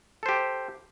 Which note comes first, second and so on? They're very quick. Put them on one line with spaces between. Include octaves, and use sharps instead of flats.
A4 C5 G4